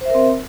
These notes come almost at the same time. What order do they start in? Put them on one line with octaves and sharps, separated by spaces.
C5 E5 A#4 C4